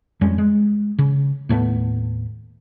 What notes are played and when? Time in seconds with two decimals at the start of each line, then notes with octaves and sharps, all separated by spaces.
0.21 F2 G3 G#3 C#4
0.38 G#3
0.99 C#3
1.49 D#2 A2 A3 B3